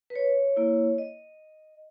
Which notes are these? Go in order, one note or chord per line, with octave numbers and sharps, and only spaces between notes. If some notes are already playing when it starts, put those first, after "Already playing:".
B4
C#5
A#3 E4
D#5